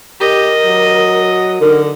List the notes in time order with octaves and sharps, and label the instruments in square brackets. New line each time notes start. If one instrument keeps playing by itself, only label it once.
[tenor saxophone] G4 [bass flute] A#4 [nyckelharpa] D#5
[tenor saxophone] F#3
[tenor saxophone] D3 [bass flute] D#4 [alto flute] A#4